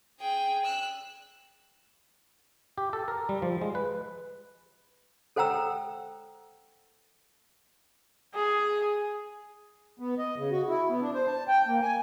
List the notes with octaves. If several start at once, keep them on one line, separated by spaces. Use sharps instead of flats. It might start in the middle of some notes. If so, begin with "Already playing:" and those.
G#4 G5
E6 F#6
G4
A4
A#4
G3
F3
G#3
B4
A4 C5 F#5 G5 A#5 E6
G#4
B3
D#5
C#3
F#4
E4
B3
D4
C5
A5
G5
A#3
G#5